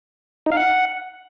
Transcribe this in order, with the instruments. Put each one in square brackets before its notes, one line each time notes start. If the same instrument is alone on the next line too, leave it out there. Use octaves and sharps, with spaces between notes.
[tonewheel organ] D#4
F5
F#5